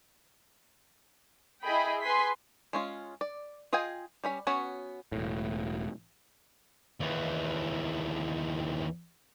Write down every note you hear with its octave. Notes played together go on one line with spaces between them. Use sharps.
E4 G#4 D#5 G5 B5
G#4 B4 G#5 C6 B6
G#3 C#4 F4
D5
F4 G#4 D#5 G5 G#5
G3 C#4 B5
B3 C#4 F#4 B4 C#5
E1 A2
D#2 E3